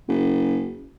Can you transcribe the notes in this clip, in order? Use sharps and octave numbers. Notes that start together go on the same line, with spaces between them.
F#1